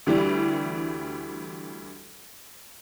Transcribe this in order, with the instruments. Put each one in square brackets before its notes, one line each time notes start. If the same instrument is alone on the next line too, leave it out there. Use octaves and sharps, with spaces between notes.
[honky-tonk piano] D2 E3 G3